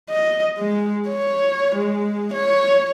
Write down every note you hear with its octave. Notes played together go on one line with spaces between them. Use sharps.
D#5
G#3
C#5
G#3
C#5